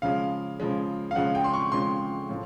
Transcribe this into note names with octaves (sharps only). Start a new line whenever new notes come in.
C#3 F3 G#3 F5
C#3 F3 G#3
F5
C#3 F3 G#3 F#5
G5
C6
C#6
C#3 F3 G#3 C6
A2 F3